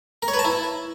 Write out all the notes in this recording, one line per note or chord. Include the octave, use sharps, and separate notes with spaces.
A#4
C#5
B4
A5
E4